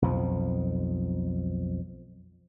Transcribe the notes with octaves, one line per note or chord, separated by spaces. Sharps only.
B1 F2 F3